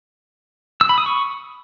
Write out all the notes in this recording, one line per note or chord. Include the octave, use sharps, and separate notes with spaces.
E6
B5
D#6
C#6